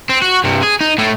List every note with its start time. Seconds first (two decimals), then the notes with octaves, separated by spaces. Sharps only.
0.10 C4
0.22 F#4
0.44 G2 C3
0.63 G#4
0.81 D#4
0.98 A2 A3